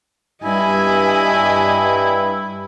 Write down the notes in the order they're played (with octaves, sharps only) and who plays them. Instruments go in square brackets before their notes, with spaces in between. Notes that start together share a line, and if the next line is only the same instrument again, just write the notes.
[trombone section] G2 [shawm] E4 [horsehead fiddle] D#5 G#5